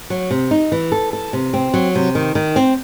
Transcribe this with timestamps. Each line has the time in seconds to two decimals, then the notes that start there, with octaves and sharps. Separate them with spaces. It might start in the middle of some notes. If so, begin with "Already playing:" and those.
0.10 F#3
0.31 C3
0.51 D#4
0.72 E3
0.92 A4
1.13 A4
1.33 C3
1.54 C4
1.74 F#3
1.95 C3
2.15 D#3
2.35 D#3
2.56 C4